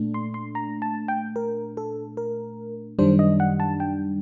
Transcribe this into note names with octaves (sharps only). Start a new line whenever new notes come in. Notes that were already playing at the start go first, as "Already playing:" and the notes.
Already playing: A#2 A3 D4
C6
C6
A#5
A5
G5
A#4
A4
A#4
F#2 D#3 G3 D4 C5
D#5
F#5
A5
G5